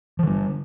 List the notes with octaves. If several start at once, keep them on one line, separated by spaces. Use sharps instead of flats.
D3 F3 G3